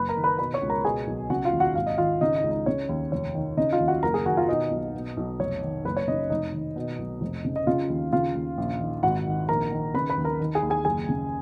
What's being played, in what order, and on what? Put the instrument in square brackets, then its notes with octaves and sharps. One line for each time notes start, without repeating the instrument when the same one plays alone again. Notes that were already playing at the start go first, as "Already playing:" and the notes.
Already playing: [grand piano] F#1 B4 B5
A#4 A#5
D#3
B4 B5
B2 B4 B5
C#5 C#6
C#2
A#4 A#5
B2 G#4 G#5
B1
C#3 F#4 F#5
F4 F5
D#2
F#4 F#5
G#1 F5
D#5
D#3 F4 F5
C#3 D#4 D#5
D#4 D#5
C#2
D#4 D#5
C#3 C#5
D#2
F1 C#5
D#3
C#3 D#4 D#5
F4 F5
D#2
F#4 F#5
F#1 A#4 A#5
G#4 G#5
D#3 F#4 F#5
F4 F5
B2 D#4 D#5
B1
B2
B1
F1 C#5
D#3
F#1 B4
C#5
C#3 D#4 D#5
F1 D#4 D#5
D#3
B2
B1
F1
C#3
D#5
C#3 F4 F5
D#2
C#3 F4 F5
D#2
A#1
D#3
G#1 F#4 F#5
D#3
A#1 A#4 A#5
D#3
C#3 B4 B5
B4 B5
D#2
A#4 A#5
D#3
G#4 G#5
D#2
G#4 G#5
F#1 G#4 G#5
C#3